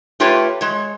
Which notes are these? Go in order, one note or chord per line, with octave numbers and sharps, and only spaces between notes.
A3 F4 G4 B4 C#5
G#3 C#5